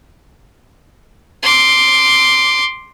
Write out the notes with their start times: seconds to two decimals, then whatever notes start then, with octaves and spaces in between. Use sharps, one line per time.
1.43 C6 D6